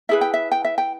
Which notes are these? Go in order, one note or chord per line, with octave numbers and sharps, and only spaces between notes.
E4 G#4 B4 E5
G5
E5
G5
E5
G5